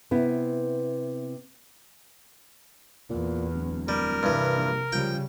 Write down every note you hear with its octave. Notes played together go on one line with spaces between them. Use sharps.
C3 B3 E4
E2 A#2
D1
G3 A#4
G2 C3 E3
A#1
C#3 F3 G3 G5